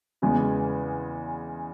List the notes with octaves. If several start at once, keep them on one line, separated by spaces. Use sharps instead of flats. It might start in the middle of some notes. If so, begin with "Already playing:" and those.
E2 C#3 G#3 B3